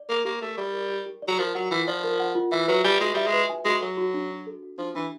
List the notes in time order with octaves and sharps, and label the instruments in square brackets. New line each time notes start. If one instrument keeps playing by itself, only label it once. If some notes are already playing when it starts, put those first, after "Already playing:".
Already playing: [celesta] D5
[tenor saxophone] A#3 [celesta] A#4
[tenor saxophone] A#3 [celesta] G4
[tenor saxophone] A3 [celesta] G4
[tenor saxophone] G3 [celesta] D5
[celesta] A#4
G4
G4
D5
[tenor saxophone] F#3
[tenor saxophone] F3 [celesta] A#4
[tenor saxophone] F#3 [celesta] F#5
[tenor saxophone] E3 [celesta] F4
[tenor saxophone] F3 [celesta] D5
[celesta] A#4
F#5
F4
[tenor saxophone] E3 [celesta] E5
[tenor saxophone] F#3 [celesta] B4
[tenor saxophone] G3 [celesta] G#5
[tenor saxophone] G#3 [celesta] F#4
[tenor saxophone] G3 [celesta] E5
[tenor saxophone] G#3
[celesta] B4
G#5
[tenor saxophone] G#3 [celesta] F#4
[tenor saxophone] F#3 [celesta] A4
[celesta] F#4
D4
D4
A4
F#4
[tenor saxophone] F3 [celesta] D4
[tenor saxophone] E3 [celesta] D4